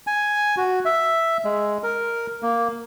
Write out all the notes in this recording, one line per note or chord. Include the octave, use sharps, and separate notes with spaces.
G#5
F#4
E5
G#3
A#4
A#3